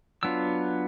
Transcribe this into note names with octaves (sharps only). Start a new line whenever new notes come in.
F#3 B3 D4 F4 E6